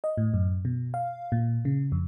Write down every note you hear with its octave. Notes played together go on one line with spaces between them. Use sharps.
D#5
A2
F#2
B2
F5
A#2
C#3
F2